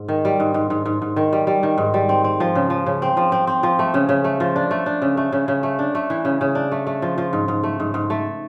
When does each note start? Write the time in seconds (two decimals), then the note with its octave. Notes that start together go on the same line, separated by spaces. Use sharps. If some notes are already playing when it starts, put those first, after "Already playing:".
Already playing: G#2
0.09 D#3
0.25 G3
0.40 G#2
0.54 G#2
0.70 G#2
0.86 G#2
1.02 G#2
1.16 D#3
1.33 G3
1.47 G3
1.63 D#3
1.78 G#2
1.94 G3
2.09 C4
2.24 C4
2.40 F3
2.55 C#3
2.70 F3
2.86 C#3
3.02 C4
3.17 F3
3.32 C4
3.47 C4
3.63 F3
3.79 A3
3.94 C#3
4.09 C#3
4.24 A3
4.40 F3
4.56 D4
4.71 A3
4.86 D4
5.02 C#3
5.17 A3
5.33 C#3
5.48 C#3
5.63 A3
5.79 D4
5.95 A3
6.10 E3
6.25 C#3
6.41 C#3
6.55 D4
6.72 A3
6.87 A3
7.02 F3
7.18 F3
7.33 G#2
7.48 G#2
7.64 A3
7.80 G#2
7.94 G#2
8.10 A3